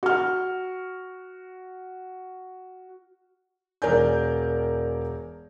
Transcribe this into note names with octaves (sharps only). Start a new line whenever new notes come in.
F#4 F6
E1 A#4 D5 G#5 G6